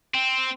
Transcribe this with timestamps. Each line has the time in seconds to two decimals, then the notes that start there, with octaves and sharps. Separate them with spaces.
0.15 C4